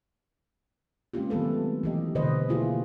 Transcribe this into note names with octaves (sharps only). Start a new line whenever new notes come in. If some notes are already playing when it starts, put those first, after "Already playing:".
G#3 A#3 C4 C#4 F4 G4
D#3 F#3 A3 B3 A4 B4
E3 G4 D#5
B2 D3 B4 C5 D#5
A3 A#3 E4 F4 G4 G#4